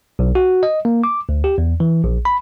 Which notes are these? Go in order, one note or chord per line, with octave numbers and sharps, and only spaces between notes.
B1
F#4
D#5
A#3
D6
D2
G4
E2
E3
A#1
B5